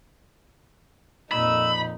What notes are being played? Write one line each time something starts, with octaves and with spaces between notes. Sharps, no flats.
F2 A#2 D#4 B5 E6